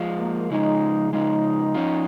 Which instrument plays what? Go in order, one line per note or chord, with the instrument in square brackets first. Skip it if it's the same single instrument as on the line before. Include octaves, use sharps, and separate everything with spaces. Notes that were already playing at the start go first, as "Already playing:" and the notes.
Already playing: [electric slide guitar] F3 G#3 F4
[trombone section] A#3
[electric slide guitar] C#3 F3 G#3 [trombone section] D#4
[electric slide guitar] C#3 F3 G#3 [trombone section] D#4
[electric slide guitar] F3 C#4 F4